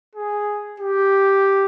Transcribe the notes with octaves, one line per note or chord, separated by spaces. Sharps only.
G#4
G4